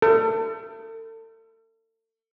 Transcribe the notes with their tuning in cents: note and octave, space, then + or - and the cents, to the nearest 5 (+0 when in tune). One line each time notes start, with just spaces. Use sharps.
A4 +35